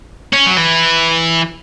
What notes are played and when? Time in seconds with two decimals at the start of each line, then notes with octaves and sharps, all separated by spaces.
0.33 C#4
0.47 F#3
0.57 E3